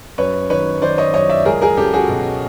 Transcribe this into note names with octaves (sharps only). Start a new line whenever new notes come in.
F#2 B4 C#5
D#3 B4 C#5
D#3 C5 D5
C#5 D#5
F#2 C#5 D#5
D5 E5
C#2 G#4 A#4
G#4 A#4
C#2 G4 A4
F#4 G#4
B2